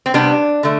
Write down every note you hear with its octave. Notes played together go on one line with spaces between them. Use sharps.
C4
C3 G3 B3 D4
D3 A3